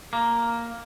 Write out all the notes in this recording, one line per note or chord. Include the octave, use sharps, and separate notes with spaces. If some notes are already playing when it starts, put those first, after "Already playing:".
A#3